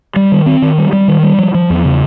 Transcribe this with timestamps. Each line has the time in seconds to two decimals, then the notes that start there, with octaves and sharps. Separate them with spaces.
0.16 G3
0.32 D#3
0.46 C4
0.62 D#3
0.78 G3
0.93 G3
1.08 D#3
1.23 G3
1.38 F3
1.54 F3
1.70 E2
1.85 C#3